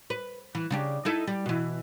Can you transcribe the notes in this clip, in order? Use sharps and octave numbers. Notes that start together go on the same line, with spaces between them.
B4
E3
C#3 D4 G4
D#4 E4 A4
G3
B2 E3